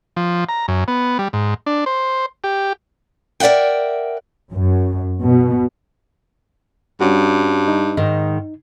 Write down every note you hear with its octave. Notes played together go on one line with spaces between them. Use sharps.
F3
A#5
F#2
B3
G3
G#2
D4
C5
G4
A#4 D5 E5 F#5 G5
F#2
B2
G2 G3 C#4 F#4
D#4
G#2 D#3